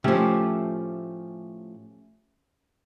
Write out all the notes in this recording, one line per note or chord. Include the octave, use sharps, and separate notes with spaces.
A2 F3 A3 C#4 G4